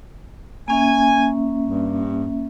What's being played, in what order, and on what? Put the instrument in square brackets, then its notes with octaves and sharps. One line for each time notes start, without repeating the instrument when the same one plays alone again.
[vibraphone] A#3 C#4 E5 [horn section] G#5
[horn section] G2